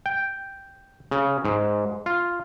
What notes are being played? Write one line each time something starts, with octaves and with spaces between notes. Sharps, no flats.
G5
C#3
G#2
F4